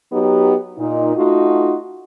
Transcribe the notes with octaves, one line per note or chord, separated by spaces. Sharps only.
F#3 B3 D#4 G4
A#2 D#4
A3 D#4 F4 F#4